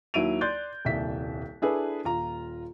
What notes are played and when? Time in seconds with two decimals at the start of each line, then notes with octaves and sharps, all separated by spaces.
0.14 D#2 F#3 E4 D7 D#7 F7
0.41 D5 C6 F#6 G6 A6
0.85 D#1 C2 E5 B6
1.62 D4 E4 G#4 A4 B4
2.04 D#1 F4 A#5